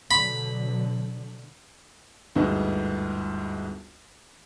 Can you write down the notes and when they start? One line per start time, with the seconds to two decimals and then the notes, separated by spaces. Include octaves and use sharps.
0.11 B2 D3 F#3 B5
2.35 G1 D2 G#2 B3 D#4